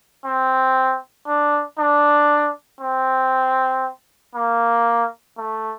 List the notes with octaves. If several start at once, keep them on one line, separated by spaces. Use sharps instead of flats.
C4
D4
D4
C4
A#3
A3